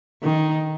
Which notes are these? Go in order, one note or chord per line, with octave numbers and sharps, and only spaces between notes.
D#3